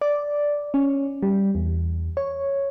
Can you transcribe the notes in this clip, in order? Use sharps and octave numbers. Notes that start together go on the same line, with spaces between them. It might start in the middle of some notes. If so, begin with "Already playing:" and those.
D5
C#4
G3
E2
C#5